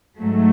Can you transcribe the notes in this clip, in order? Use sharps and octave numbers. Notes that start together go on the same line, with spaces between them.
G#2 F#3 A3